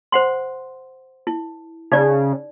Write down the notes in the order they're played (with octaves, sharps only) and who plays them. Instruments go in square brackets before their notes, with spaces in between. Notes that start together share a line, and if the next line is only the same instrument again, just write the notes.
[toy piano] C5 F#5 C6
E4
[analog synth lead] C#3 [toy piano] D#4 D5